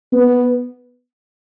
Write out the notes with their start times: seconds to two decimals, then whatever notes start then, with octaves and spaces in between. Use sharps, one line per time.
0.13 B3